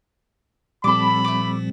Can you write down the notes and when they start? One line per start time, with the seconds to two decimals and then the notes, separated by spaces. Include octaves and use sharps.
0.84 A#2 F3 G3 C4 A4 B5 D6
1.25 A3 D6